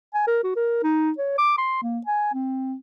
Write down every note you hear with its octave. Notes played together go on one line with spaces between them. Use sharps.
G#5
A#4
F#4
A#4
D#4
C#5
D6
C6
A#3
G#5
C4